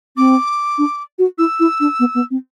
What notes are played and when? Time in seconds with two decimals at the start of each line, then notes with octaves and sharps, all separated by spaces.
0.17 C4 D6
0.78 D4
1.19 F#4
1.38 E4 E6
1.60 E4
1.80 D4
2.00 B3
2.15 B3
2.31 C4